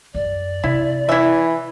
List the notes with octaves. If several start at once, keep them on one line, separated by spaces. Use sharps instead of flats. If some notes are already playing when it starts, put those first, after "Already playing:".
F#2 D5
C3 E4
E3 E4 E5